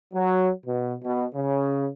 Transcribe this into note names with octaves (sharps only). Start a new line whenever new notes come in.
F#3
B2
B2
C#3